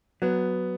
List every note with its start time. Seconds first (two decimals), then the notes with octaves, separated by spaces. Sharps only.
0.22 F#3 B3